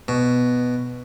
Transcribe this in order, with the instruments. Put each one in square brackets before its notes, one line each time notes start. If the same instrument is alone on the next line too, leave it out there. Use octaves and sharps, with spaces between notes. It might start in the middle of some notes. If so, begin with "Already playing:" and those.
[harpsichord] B2